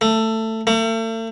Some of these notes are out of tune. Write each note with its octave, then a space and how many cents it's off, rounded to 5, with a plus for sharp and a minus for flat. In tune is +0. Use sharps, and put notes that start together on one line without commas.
A3 +15
A3 +40